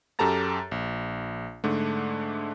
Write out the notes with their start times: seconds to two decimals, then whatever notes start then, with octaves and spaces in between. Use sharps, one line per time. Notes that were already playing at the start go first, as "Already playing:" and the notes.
0.19 F#2 G4 A4 A5 A#5 A6
0.71 A#1
1.64 G#2 D3 A3